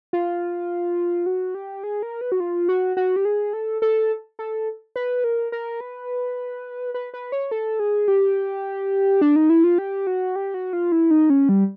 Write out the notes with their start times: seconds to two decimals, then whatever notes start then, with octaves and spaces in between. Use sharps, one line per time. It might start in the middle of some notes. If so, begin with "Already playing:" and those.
0.13 F4
1.26 F#4
1.55 G4
1.84 G#4
2.03 A#4
2.21 B4
2.32 F#4
2.40 F4
2.69 F#4
2.97 F#4
3.16 G4
3.25 G#4
3.53 A4
3.82 A4
4.39 A4
4.96 B4
5.24 A#4
5.52 A#4
5.80 B4
6.94 B4
7.14 B4
7.32 C#5
7.51 A4
7.80 G#4
8.08 G4
9.21 D4
9.36 D#4
9.50 E4
9.64 F4
9.78 G4
10.07 F#4
10.36 G4
10.54 F#4
10.73 F4
10.92 E4
11.11 D#4
11.30 C#4
11.49 G3